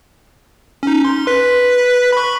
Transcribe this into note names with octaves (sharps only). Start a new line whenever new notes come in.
C#4 D#4
C6
B4 B6
B5 C#6